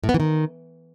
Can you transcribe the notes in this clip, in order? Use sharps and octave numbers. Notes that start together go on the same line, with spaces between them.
A2
B3
E3
D#3